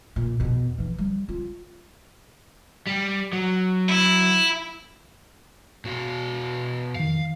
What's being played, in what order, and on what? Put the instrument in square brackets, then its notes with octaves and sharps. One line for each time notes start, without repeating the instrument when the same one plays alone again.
[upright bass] A#2
E2 B2
E3 D#4
G3
F4
[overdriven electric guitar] G3
F#3
[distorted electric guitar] E4
[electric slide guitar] B2 F#4 F5
[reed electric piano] F2 D#3 [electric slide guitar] F5